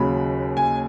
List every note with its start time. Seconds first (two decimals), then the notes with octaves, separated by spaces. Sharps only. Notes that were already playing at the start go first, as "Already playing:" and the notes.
Already playing: D#2 C#3 F#3 B5
0.57 G#5